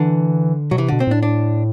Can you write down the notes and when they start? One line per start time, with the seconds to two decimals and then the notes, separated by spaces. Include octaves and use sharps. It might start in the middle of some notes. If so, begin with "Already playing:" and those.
Already playing: D3 E3
0.71 B2 F#3
0.78 C3 E3
0.88 B2 D3
1.00 C4
1.07 A2 D4
1.23 D4